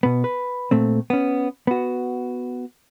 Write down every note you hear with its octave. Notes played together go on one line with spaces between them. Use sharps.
B2 B3
B4
A#2 A3 C4
B3 C#4
B3 F#4